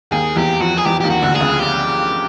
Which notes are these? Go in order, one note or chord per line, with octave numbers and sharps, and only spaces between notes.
D#2 D#3 G#4
E2 E3 G4
F2 F3 F#4
G#4
E2 E3 G4
D#2 D#3 G4
F#4
D2 D3
G#4
C#2 C#3
G4